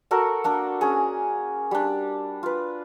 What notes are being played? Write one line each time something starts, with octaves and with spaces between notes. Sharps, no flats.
F#4 A4 A#4 F#5
A#3 D4 A4
C#4 G#4
G3 D4
F4 B4